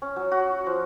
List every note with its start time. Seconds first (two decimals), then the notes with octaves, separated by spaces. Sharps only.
0.02 C#4
0.16 F#3
0.31 F#4
0.66 F3